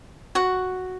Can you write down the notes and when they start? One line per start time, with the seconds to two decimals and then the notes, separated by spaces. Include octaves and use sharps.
0.35 F#4 F#5